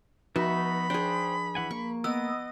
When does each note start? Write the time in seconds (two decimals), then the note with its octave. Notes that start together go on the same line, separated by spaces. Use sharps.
0.36 F3 B3 D#4 F#4 E5 B5
0.90 D4 G#4 C5 G5
1.55 E3 F#5 G#5
1.71 A#3 C#6
2.04 B3 D#5 E6